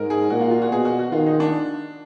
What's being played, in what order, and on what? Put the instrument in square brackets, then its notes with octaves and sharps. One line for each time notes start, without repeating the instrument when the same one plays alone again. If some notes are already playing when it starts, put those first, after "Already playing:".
Already playing: [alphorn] G#2 [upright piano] A#4
[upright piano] G#4
[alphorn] A#2 [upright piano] F#4
[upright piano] F4
F4
F#4
[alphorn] B2 [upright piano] G#4
[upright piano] F#4
F#4
[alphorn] D#3 [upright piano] F4
[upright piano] D#4
D4